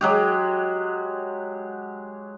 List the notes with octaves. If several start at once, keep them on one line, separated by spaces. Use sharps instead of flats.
F#3 G#3 G4